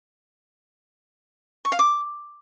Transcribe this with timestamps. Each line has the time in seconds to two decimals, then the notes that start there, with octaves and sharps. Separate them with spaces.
1.65 C#6
1.72 F5
1.79 D6